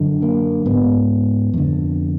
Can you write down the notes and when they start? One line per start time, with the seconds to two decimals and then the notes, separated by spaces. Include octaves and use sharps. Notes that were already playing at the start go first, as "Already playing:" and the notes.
Already playing: F#2 D3
0.22 A#3
0.66 G#2 B3
1.54 F2 D3